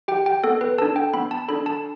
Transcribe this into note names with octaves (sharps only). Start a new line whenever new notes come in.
G4 G5
G5
B3 A4
B4
D4 A4 A5
G5
B3 B5
A5
D4 A4 B5
A5